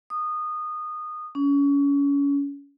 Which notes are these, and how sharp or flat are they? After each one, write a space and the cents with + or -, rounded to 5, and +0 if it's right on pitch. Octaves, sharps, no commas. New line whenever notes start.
D#6 -20
C#4 +30